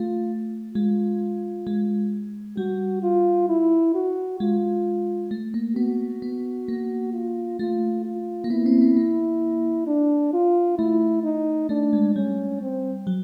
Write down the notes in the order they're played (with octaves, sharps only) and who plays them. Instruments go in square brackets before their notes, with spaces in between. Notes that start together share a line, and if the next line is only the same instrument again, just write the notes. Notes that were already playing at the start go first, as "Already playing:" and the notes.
Already playing: [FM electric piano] A3 [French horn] F4
[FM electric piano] G#3 [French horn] F4
[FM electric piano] G#3
[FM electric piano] G3 [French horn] F#4
[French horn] F4
E4
F#4
[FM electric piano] G#3 [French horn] F4
[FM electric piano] A3
A#3
[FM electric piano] B3 [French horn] F#4
[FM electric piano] B3
A#3
[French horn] F4
[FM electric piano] A3 [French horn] F4
[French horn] F4
[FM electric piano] A#3
[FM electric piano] B3 [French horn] E4
[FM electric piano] C4
B3
A#3
[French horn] D4
F4
[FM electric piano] A3 [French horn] E4
[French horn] D#4
[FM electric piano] A3 [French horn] D4
[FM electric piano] G#3
[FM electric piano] G3 [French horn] C#4
[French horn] C4
[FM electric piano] F#3